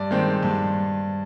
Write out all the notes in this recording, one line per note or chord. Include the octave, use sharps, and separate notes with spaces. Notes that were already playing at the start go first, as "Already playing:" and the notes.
Already playing: G2 D5
D#3 G#3 C4
G2